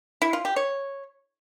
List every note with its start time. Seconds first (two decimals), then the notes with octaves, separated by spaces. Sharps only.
0.22 E4
0.33 F4
0.45 G4
0.56 C#5